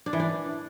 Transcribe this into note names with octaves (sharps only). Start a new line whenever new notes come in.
D4
E3
D4